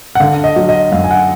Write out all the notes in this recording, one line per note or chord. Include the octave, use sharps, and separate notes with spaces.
F#5
D3 F5
D#5
F#3
D#5
F#2 F5
G#5
F#5